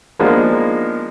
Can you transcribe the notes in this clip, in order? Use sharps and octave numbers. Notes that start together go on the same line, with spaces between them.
F3 G#3 A#3 B3 D4 D#4